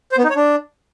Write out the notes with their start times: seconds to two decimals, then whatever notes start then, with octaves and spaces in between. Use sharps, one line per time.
0.12 C5
0.18 B3
0.24 D#4
0.30 C#5
0.36 D4